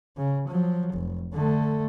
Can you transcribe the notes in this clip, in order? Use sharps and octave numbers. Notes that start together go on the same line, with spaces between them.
C#3
F3 F#3
F1
D3 A3